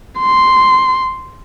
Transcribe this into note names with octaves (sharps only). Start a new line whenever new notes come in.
C6